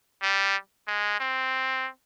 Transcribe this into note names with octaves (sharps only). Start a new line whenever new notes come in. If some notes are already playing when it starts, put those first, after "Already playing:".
G3
G#3
C4